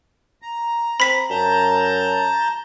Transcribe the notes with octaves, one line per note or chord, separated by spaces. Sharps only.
A#5
C4 B5 B6
F#2 A5 A#5 G6